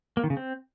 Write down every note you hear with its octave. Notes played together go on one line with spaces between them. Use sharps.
A#3
D#3
C#3
C4